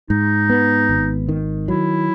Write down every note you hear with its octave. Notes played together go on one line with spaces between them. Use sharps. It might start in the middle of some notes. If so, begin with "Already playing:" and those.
G#2 D#4
B3
G#1
D#3
F#3 E4